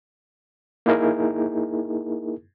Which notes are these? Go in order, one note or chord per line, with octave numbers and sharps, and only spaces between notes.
A#3 D#4 E4 G#4 A#4